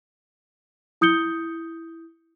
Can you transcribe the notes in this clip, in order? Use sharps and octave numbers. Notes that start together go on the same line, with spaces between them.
E4 D#6 G6 C#7 G7